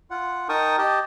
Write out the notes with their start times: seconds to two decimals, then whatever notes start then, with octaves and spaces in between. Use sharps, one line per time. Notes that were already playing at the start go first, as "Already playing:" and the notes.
0.11 F4 F#5
0.49 D#4 A#4 G5 A5 C#6 D#6
0.78 G4 D#5 G5 A5